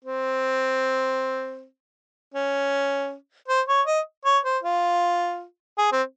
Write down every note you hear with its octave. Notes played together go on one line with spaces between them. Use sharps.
C4
C#4
C5
C#5
D#5
C#5
C5
F4
G#4
C4